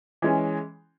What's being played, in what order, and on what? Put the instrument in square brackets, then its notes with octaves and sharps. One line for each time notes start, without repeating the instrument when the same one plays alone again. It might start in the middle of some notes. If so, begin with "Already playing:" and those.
[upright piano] E3 G#3 C#4